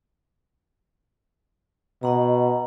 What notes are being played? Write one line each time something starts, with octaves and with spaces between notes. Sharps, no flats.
B2 D#5 F#5 A#5